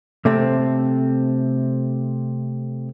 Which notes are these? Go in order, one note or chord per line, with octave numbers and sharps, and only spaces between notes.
C3 A3 C4